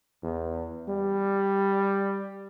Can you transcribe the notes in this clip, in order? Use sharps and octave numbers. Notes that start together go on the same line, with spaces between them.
E2
G3